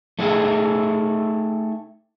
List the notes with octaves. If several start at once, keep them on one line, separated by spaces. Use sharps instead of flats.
A3 D#4 G4 G#4 E5